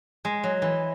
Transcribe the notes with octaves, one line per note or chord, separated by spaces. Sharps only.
G#3
F#3
E3